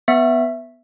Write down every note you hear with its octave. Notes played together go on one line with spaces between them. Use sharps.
B3 E5